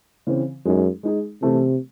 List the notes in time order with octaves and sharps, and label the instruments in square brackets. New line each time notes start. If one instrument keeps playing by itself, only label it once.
[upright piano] C#3 E3 C4
[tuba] F#2 [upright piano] G#3 D#4 G#4
[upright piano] G#3 D#4 G#4
[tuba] C3 [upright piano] E3 A3 C4 E4 A4